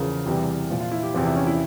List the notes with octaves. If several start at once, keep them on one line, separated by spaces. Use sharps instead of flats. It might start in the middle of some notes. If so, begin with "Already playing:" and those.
Already playing: E2 C#3 F3 A#4
E2 C3 E3 G3
A#2 F3
F4
E4
G4
E2 C3 F3
E4
C#4
E4